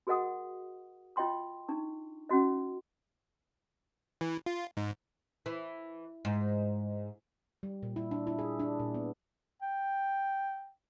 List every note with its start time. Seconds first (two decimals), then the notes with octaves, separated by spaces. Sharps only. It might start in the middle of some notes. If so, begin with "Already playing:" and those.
0.07 F#4 G#4 A#4 D#5 F#5 D#6
1.16 F4 D#5 G5 C6 D6
1.68 D4 D#4 C#6
2.29 C#4 E4 F#4 D#5
4.21 E3
4.46 F4
4.77 G#2
5.46 E3
6.25 G#2
7.63 G3
7.83 A#2
7.96 E4
8.11 D4
8.27 E4
8.39 G#4
8.59 D4
8.79 A#2
8.94 B3
9.62 G5